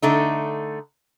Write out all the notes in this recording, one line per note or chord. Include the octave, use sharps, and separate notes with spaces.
D3 A3 D#4